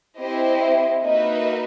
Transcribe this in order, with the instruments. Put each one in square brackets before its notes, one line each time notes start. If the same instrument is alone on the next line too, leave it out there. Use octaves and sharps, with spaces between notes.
[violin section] C4 E4 G4 C5 D#5
[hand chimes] E5
[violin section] A#3 D#4 F#4 B4 E5 [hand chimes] D#5